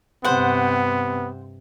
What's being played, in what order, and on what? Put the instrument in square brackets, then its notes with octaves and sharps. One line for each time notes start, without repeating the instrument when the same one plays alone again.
[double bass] G2 C3 [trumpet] B3 [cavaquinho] C5 F#5